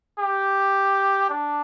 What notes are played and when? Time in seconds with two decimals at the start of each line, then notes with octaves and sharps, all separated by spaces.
0.19 G4
1.29 D4